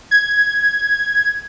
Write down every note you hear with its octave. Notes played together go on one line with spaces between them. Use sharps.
G#6